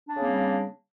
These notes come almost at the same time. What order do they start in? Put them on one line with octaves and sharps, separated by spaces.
D4 C4 C#3 A#3 G3